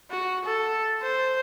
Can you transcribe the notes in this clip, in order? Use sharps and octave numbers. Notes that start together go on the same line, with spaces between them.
F#4
A4
C5